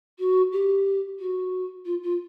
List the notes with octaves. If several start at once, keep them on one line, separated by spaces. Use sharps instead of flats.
F#4
G4
F#4
F4
F4